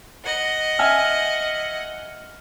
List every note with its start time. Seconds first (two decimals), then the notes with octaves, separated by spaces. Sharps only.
0.25 D#5 F#5
0.79 E5 G#5 F6